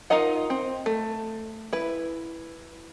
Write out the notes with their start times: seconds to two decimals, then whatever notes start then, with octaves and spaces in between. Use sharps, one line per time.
0.10 D#4 F4 A#4 D#5 F#5
0.50 C4
0.86 A3
1.73 E4 B4